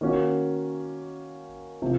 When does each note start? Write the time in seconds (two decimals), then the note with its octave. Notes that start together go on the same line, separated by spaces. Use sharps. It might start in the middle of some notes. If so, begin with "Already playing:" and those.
0.01 D#3 A#3 C#4 F#4
1.82 C3 F3